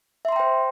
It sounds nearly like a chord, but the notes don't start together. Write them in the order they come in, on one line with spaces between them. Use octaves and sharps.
E5 C6 A#5 G5 C5